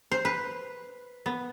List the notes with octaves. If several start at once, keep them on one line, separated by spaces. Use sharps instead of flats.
C5
B4
B3